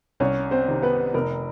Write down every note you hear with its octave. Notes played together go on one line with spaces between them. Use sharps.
C2 C#4 C#5
C4 C5
C3 D#3
B3 B4
F1 A#4